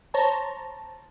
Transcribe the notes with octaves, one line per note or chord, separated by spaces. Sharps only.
C5 C#5 A5 A#5